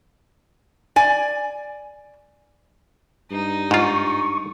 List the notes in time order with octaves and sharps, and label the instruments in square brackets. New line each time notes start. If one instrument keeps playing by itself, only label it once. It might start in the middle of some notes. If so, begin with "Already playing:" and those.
[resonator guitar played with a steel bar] D5 G#5
[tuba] G2 [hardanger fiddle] D#4
[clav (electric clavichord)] G#2 F4 [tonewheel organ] C#6